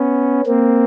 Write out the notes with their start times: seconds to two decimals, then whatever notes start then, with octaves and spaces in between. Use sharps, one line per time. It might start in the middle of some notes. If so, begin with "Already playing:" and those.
Already playing: B3 C#4
0.47 A#3 C4